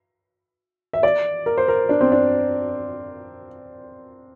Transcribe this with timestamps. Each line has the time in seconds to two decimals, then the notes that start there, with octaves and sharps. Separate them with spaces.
0.93 E5
1.03 D5
1.46 A#4
1.58 C5
1.68 A#4
1.89 D4
2.01 C4
2.12 D4